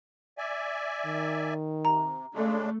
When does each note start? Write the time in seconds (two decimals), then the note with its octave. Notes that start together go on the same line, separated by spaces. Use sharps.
0.38 D5 E5 G#5
1.06 D#3
1.85 C3 A#5
2.34 C#3 G#3 A3 D4